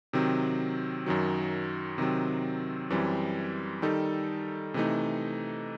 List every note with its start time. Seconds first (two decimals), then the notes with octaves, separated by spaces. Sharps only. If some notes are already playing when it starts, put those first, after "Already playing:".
0.13 C3 D#3 F#3 C4
1.06 F#2 D#3 F#3
1.98 C3 D#3 F#3 C4
2.90 F#2 E3 G3 C4
3.82 D#3 G3 D#4 A4
4.74 C3 E3 A3 D#4